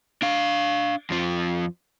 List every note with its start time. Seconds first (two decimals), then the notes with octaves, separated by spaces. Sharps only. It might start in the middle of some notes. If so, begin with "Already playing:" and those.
0.22 D4 F5
1.10 F2 F3